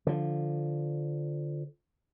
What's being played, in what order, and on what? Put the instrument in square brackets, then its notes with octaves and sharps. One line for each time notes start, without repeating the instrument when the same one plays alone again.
[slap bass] D3 F3